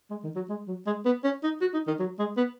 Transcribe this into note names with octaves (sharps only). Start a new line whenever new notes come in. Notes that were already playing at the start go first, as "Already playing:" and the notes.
G#3
D#3
F#3
G#3
F#3
G#3
B3
C#4
D#4
F#4
D#4
D#3
F#3
G#3
B3